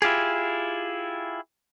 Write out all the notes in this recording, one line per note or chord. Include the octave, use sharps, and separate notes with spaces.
E4 F4 G4 G#4